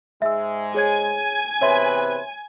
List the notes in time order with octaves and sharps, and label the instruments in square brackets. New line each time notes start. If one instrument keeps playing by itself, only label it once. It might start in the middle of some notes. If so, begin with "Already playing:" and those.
[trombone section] G#2 G#3 [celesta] E5 E6
[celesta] G#4 C#5 G#6 [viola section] G#5
[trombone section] E2 C3 B4 [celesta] C#5 E5 C6